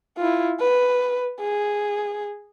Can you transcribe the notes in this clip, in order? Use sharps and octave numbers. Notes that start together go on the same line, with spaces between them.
E4 F4
B4
G#4